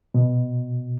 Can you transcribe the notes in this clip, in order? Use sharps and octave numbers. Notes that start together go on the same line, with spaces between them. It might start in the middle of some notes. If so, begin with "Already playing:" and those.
B2